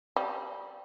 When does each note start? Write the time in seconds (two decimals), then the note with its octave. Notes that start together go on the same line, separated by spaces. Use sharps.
0.16 G3